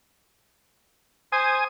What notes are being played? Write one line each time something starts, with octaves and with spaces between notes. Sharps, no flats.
C5 G#5 D#6